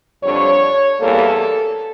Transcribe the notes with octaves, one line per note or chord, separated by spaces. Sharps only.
F2 D3 G3 D4 C#5
E2 E3 G3 A#3 A4